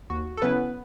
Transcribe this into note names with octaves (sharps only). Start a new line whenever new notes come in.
D#2 F#4
A4
C#3 F#3 B3 C#4 E4 B4